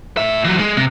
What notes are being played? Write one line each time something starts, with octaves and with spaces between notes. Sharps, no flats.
A2 E5
E3 F#3
G#3
C3